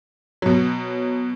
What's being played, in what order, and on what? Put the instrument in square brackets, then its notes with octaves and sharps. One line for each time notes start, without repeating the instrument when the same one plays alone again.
[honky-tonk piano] B2 F#3